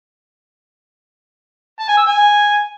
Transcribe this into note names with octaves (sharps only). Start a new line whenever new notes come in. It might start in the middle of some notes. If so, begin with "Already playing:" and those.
A5
G#5
E6
G#5